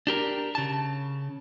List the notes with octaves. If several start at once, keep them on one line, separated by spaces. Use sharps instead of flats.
D4 G4 A#4
C#3 A5